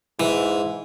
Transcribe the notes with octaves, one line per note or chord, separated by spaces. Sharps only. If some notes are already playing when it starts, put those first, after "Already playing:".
G#2 E3